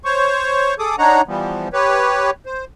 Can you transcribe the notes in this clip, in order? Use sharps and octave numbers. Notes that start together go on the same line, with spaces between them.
C5 C#5 C#6
G#4 A4 D6 D#6
D4 D#4 C#5 F#5 A#5
E3 F3 G3 B3
G4 B4 C#5
C5